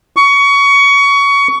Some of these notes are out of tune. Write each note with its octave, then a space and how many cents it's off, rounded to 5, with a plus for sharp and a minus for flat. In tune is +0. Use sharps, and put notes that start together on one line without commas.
C#6 +20